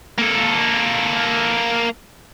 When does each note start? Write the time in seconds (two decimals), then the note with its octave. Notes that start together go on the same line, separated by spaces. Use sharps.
0.19 A#3 A4